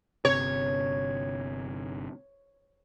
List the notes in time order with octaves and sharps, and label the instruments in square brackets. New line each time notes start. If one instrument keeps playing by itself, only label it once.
[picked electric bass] G1 C3 [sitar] C#5